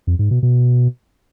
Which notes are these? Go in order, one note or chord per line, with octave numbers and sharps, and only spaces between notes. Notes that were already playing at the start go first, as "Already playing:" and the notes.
F2
G#2
B2
B2